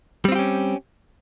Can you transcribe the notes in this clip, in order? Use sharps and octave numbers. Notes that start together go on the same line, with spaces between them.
G3 C4 C#4 F4 G4